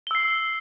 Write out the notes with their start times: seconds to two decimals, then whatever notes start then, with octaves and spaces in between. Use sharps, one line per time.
0.07 G7
0.11 E6
0.15 C7